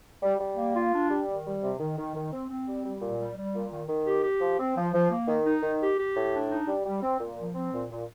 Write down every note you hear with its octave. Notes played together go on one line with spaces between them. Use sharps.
G3
G3
A#3
F4
D4
G3
D#3
G3
C3
D#3
D#3
D#3
C4
C4
G3
G3
A#2
G3
G3
A#2
D#3
D#3
G4
G4
F3
C4
F3
F3
A#3
D#3
D#4
D#3
G4
G4
A2
D4
D#4
G3
G3
C4
A#2
F3
C4
A#2
A#2